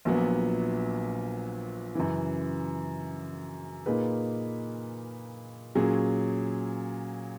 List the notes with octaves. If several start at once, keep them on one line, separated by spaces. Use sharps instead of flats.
A#1 A#2 F#3 B3
F#2 C#3 E3
A#2 A#3 D#4 G#4 B4
A#2 F#3 C#4 G#4